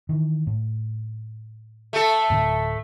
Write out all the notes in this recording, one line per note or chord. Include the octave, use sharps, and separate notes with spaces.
D#3 E3
A2
A3 A4
D1 A2 D3